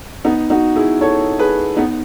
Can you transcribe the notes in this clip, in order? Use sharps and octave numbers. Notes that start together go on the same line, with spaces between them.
B3 D#4
D#4 F#4
E4 G#4
A4 C#5
G#4 B4
B3 D#4